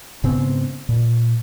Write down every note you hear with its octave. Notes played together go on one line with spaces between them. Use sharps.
G#2 C#3 B3 C4
A#2